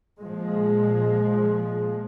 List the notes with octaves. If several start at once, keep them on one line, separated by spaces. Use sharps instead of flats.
A#2 F3 G#3